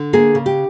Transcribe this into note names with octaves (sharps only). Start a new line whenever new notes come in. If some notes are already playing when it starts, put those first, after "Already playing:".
Already playing: D3
A#3 G#4
C#3
G4